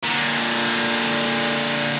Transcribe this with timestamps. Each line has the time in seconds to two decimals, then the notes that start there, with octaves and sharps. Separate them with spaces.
0.03 A#2 D3